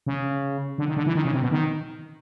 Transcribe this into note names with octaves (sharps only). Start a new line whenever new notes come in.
C#3
D3
D#3
D3
E3
D#3
C#3
C3
B2
D#3